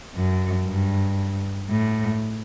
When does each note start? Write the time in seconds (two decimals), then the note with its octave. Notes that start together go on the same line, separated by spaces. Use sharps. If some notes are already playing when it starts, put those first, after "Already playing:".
0.15 F#2
0.66 G2
1.69 A2